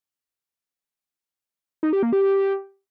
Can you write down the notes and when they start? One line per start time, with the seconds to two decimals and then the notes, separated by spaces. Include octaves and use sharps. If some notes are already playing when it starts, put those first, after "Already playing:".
1.83 D#4
1.93 G4
2.03 A#3
2.13 G4